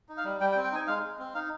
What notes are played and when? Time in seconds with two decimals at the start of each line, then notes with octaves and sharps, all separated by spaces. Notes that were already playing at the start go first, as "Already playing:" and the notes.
0.09 D#4
0.17 F5
0.25 G3
0.40 G3 G5
0.52 G5
0.56 C4
0.64 G5
0.72 D#4 G#5
0.87 G#3 F5
1.03 G#3
1.19 C4
1.35 D#4 F5